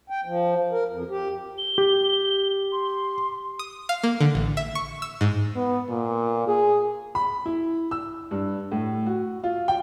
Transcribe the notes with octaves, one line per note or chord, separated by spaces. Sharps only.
G5
F3
A#4
F2
G4
G7
G4
C6
D#6
F5
A#3
D3
A1
E5
C#6
E6
G#2
B3
A#2
G#4
B5
E4
E6
G2
A2
F#4
F4
G5